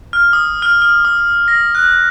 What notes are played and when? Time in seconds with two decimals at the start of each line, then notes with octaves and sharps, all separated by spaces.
0.13 F6
0.33 D#6
0.62 F6
0.82 F6
1.05 D#6
1.48 A#6
1.75 F#6